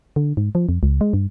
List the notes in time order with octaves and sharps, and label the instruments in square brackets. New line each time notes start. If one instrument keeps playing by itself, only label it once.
[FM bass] D3
G#2
F3
F2
C#2
G#3
G2